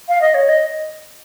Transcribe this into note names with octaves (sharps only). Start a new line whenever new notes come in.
F5
D#5
C#5
D#5